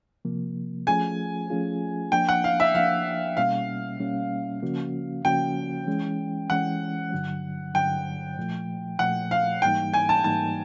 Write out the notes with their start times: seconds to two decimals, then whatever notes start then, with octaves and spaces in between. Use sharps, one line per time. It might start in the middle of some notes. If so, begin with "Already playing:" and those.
0.25 C3 F3 A#3
0.87 F3 A3 C#4 F4 G#4 G#5
1.50 F3 A3 C#4 F4 G#4
2.12 F3 A#3 D4 G5
2.29 F#5
2.44 F5
2.60 E5
2.75 F3 A#3 D4 F5
3.37 B2 G3 A#3 C#4 F5
4.00 B2 G3 A#3 C#4
4.63 C#3 F3 A#3 C#4 F#4
5.25 C#3 F3 A#3 C#4 F#4 G5
5.87 E3 G#3 C#4
6.50 E3 G#3 C#4 F#5
7.12 G2 D3 F#3
7.74 G2 D3 F#3 G5
8.37 A#2 F3 A3
8.99 A#2 F3 A3 F#5
9.31 F5
9.62 G#2 E3 G3 A#3 D#4 G5
9.94 G#5
10.09 A5
10.24 G#2 E3 G3 A#3 D#4 A5